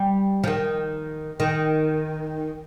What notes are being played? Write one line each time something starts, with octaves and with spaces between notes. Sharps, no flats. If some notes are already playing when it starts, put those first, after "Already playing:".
Already playing: G3
F3
D#3
D#3